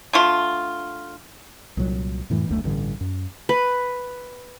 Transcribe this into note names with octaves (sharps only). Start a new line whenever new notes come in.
D3 A3 F4
C2 A#2 F#3
F2 A2 E3 A3
F#1 D2 C3 A3
A1 G2 D3
F#2
B4